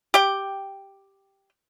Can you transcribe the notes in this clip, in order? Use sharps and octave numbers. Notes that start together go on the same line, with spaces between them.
G4 G5